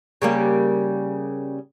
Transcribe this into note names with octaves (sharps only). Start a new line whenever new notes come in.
C#3 G3 A#3